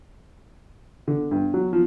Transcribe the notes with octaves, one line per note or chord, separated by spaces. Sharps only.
D3
G2
F#3
F3